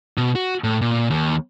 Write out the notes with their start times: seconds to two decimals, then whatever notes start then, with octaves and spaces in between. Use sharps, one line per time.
0.17 B2
0.35 F#4
0.64 A2
0.82 A#2
1.10 D#2